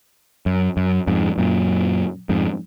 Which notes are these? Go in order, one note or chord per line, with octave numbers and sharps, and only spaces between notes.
F#2
F#2
F2 G#2
F#2 A#2
F2 G#2